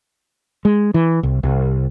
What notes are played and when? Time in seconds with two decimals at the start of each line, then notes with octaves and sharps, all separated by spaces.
0.65 G#3
0.94 E3
1.23 C2
1.43 C2